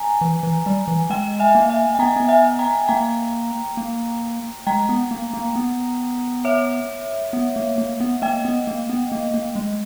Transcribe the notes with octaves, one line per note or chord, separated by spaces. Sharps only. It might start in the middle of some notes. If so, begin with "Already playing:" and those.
Already playing: G#5 A#5
E3
E3
G3
E3
G#3 D#5 G5
E5 G#5
A#3
E5 G#5
G#5
B3 G5 A#5
B3
E5 G#5
G5 A#5
A#3 G5 A#5
A#3
G#3 G5 A#5
B3
A#3
A#3
B3
C#5 E5
B3
A#3
A#3
B3
A#3 D#5 G5
B3
A#3
B3
A#3
A#3
G#3